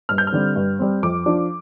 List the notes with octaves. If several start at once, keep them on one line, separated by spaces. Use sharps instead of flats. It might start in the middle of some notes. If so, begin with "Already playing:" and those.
G2 F6
G6
F6
D3 G3 C4
G2
G3 C4
F2 D6
F3 D4